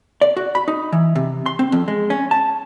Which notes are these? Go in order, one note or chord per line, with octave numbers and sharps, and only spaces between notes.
D5
F#4
B5
D#4
E3
C3
C6
C4
F2
G#3
C#4
A5